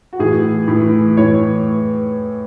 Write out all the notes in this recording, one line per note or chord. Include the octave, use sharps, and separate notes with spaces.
F#4
A2 E3 G#4
A2 E3
A2 E3 C#5